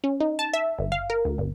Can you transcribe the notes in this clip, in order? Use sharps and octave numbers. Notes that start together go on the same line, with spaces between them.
C#4
D#4
A5
E5
G1
F5
A#4
D2
G1